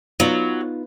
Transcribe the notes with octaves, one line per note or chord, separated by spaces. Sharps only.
F#3 B3 D#4 F4